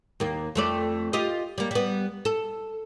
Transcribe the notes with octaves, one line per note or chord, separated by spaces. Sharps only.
D#2 A#3
F2 A3 D5
F4 G4 D#5
G3 A#3
G3 B3
A4